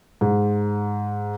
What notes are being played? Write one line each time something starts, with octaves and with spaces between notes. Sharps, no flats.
G#2